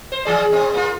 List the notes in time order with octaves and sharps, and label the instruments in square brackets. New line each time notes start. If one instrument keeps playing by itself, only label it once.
[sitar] C5
E3 G#4 D5
G#2 C4
A#3 F4